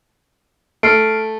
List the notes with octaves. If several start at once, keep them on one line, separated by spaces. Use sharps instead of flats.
A3 F6 C7 D7